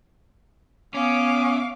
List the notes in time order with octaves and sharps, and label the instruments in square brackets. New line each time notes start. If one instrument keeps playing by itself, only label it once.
[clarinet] B3 [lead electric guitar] C#4 [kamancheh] F5 D6